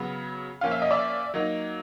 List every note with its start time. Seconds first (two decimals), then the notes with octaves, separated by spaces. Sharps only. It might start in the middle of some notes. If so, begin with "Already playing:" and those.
Already playing: C#3 F#3 B3
0.61 F3 A#3 C#4 F4 F5
0.71 E5
0.82 D#5
0.91 D5 E5
1.34 F#3 A#3 D#4